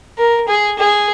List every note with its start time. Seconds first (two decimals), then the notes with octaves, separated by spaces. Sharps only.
0.18 A#4
0.48 G#4
0.79 G#4